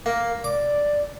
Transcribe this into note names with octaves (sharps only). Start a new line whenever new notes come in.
A#3
D5 D6